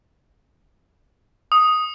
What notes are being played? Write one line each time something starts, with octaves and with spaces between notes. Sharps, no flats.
D#6